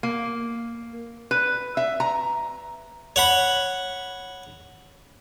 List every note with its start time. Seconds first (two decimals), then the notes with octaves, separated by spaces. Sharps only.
0.03 A#3
1.31 B4
1.77 E5
2.00 A#5
3.16 C#5 F#5 B5